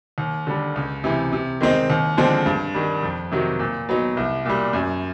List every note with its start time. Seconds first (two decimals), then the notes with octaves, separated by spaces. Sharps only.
0.18 D#2
0.47 D3 G3
0.76 C#2
1.04 C3 E3
1.32 C3
1.61 D#3 G#3 C4 D#4
1.90 D#2
2.17 D3 F3 G#3 C4
2.46 G2
2.75 D#3 G3
3.03 F2
3.32 C3 D#3 F#3
3.59 A#2
3.89 F#3 B3 D#4
4.17 C2
4.45 A#2 G3
4.73 F#2